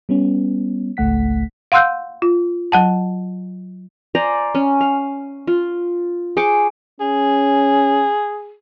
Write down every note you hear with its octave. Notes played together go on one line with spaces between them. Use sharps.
G3 B3 C#4
G#1 C#2 A3 F#5 B6
F5 F#5 C6 E6 F#6 G6
F4
F#3 F#5 A5
C5 D5 G#5 A#5
C#4
F5
F4
G#4 C5 C#6 D6
C#4 G#4